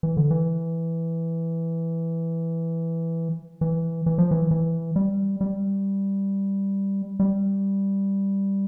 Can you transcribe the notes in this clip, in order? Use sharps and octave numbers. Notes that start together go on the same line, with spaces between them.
E3
D3
E3
E3
E3
F3
E3
E3
G3
G3
G3